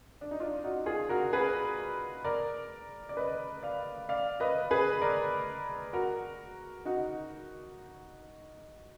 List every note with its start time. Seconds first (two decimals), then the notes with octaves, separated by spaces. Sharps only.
0.21 D4
0.31 D#4
0.40 D4 F4
0.64 D#4 F#4
0.86 F4 G#4
1.09 F#4 A#4
1.33 G#4 B4
2.25 A#4 D5
3.09 D5
3.17 B4 D#5
3.63 D5 F5
4.09 D5 F5
4.40 B4 D#5
4.71 G#4 B4
5.01 A#4 D5
5.93 F#4 A#4
6.85 D#4 F#4